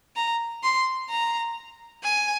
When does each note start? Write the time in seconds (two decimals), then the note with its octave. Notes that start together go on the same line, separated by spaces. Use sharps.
0.16 A#5
0.63 C6
1.09 A#5
2.03 G#5